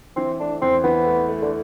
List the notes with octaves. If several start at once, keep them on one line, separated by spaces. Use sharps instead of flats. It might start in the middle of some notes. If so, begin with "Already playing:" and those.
E3 C4
A3 D4
E2 C4
E3 B3
A3
A3
D3